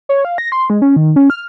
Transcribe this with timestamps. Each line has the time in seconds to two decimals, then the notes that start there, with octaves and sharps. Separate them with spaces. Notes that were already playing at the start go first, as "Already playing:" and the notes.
0.09 C#5
0.25 F5
0.38 A#6
0.52 C6
0.70 G#3
0.82 C#4
0.96 D#3
1.16 C#4
1.30 F6